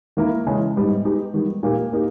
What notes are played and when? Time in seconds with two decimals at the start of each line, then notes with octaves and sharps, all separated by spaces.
0.17 D#3 A#3 E4 A#4
0.46 C#3 E3 G#3 C#4
0.76 G#2 G3 B3
1.05 G#3 D#4 G4 B4
1.34 D#3 G3 B3
1.63 A#2 A#3 D#4 G4
1.93 A#3 D#4 G4